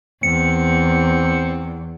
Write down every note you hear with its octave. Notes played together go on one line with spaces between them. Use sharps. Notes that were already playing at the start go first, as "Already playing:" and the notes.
E2 C4 C#7